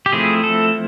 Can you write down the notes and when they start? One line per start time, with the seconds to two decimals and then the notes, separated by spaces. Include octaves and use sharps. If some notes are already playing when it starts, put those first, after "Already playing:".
0.06 G4
0.12 F3 A3 C4 E4 G#4
0.44 A4